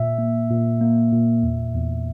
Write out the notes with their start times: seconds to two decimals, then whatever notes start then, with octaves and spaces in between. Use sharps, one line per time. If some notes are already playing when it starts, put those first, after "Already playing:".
Already playing: A#2 E5
0.18 A#3
0.51 A#2
0.81 A#3
1.12 A#2
1.43 E2
1.74 E2